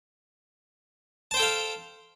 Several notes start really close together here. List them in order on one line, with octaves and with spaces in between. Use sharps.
A5 C5 G5 A4 F5